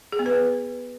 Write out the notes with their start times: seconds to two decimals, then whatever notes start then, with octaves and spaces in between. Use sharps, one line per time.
0.12 G#4
0.19 B3
0.26 B4